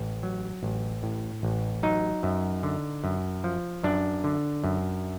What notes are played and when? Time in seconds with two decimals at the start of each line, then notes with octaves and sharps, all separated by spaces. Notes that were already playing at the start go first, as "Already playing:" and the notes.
Already playing: A1
0.23 F#3
0.63 A1
1.03 A2
1.43 A1
1.83 F#3 D#4
2.23 F#2
2.63 D3
3.04 F#2
3.44 F3
3.83 F#2 D4
4.24 D3
4.64 F#2